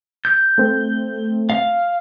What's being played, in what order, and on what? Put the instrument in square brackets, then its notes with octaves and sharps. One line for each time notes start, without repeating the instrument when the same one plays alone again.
[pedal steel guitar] G6
[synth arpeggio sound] A3 C4
[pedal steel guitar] F5